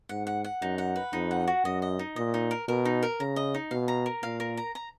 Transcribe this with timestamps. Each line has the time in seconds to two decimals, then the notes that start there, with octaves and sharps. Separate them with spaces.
0.09 G#2 F#5
0.27 F#5
0.44 F#5
0.62 F#2 D#4
0.78 F#5
0.96 B4
1.13 F2 D#4
1.31 F#5
1.48 F#4
1.64 F#2 D#5
1.82 D#5
1.99 D#4
2.16 A#2 D#5
2.34 D#4
2.51 A#4
2.68 B2 A#4
2.85 D#4
3.03 A#4
3.20 C#3 A#5
3.36 D#5
3.54 D#4
3.71 B2 F5
3.88 A#5
4.06 A#4
4.23 A#2 F5
4.40 A#4
4.57 A#5
4.75 A#5